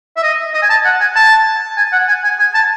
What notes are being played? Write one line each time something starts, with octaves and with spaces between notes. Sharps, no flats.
E5
D#5
D#5
G#5
A5
F#5
G#5
A5
G#5
F#5
G#5
G#5
G#5
A5